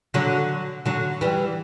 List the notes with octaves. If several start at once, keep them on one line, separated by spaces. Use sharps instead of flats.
D3 F#3
D3 F#3
E3 G3